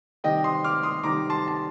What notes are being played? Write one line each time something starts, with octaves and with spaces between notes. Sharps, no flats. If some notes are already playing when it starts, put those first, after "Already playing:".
C3 D#3 G3 D#5 G5
C6 D#6
D6 F6
C6 D#6
C3 D#3 G3 A#5 D6
A5 C6
A5